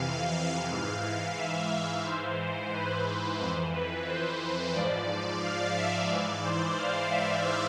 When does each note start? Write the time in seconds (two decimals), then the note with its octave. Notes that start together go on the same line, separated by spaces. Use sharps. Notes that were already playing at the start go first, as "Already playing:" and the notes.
Already playing: F2 C3 E3 F5
0.70 G#2 E3 F5
1.37 E5
2.05 G#2 E3 C5
2.73 B4
3.40 F2 E3 C5
3.74 B4
4.08 C5
4.75 G#2 F3 D5
5.43 F5
5.77 E5
6.11 G#2 E3 D5
6.45 C5
6.78 F5
7.12 E5